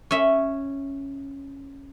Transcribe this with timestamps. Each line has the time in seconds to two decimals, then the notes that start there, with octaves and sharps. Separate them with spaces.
0.11 C#4 E5